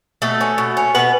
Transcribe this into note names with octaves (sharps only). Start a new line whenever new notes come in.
B2 A3 A4
C#4
B2
C#4
B2 B3 B4